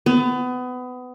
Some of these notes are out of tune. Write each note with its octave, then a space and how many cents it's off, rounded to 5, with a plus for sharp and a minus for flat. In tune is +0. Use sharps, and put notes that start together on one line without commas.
B3 +25